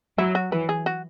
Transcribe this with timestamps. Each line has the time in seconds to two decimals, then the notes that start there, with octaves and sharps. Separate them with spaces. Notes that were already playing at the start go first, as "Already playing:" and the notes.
0.18 F#3 E4
0.35 F#4
0.51 E3 B4
0.69 G#4
0.86 F#4